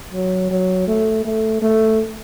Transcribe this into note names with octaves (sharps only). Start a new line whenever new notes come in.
F#3
F#3
A3
A3
A3